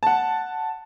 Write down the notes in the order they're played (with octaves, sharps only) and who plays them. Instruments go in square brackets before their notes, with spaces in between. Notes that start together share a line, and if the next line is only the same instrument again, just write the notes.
[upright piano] F#5 A5